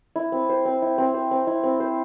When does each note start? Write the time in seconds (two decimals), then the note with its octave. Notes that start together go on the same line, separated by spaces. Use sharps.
0.16 E4
0.32 C4
0.49 C5
0.65 C4
0.82 E4
0.98 C4
1.14 C5
1.31 C4
1.47 E4
1.63 C4
1.80 C5